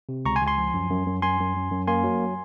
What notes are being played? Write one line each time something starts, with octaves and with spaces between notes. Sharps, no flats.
C3
C#2 A#5 C#6
G#5 C6
C#2
G#5 C6
F3
F#2
F#2
F#2
F#2 G#5 C6
F#2
F#2
F#2
A#3 G#5 C6
F#3